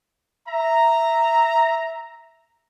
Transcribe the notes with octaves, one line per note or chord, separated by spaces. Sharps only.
E5 A#5